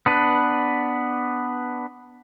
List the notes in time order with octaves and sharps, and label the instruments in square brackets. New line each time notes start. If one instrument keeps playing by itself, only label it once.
[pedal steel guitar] B3 D4 B4